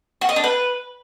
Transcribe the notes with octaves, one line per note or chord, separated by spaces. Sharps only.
F#4
D#5
D4
B4